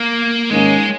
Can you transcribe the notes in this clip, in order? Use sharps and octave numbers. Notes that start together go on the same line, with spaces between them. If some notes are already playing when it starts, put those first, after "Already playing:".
Already playing: A#3
G#2 D#3 G#3 A#3 C#4